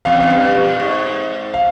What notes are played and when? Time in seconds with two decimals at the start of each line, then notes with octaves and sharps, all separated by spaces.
0.05 E2 F5
0.20 G#2 F5
0.30 G2
0.55 A#2
0.80 G#2
1.54 F5